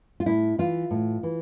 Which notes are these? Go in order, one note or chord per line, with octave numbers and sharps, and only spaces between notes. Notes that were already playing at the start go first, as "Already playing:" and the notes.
F4
A2 E4
E3 F4
A2
E3